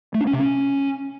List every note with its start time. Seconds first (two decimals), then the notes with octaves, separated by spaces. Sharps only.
0.14 A3
0.21 D4
0.27 C#4
0.33 C3
0.39 C#4